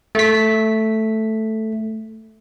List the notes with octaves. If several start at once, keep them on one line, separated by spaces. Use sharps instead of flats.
A3 B6